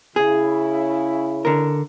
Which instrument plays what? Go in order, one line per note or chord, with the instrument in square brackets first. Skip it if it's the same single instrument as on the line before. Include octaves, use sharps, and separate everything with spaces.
[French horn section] C#3 E4 [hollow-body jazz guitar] G#4
[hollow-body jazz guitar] D3 A#4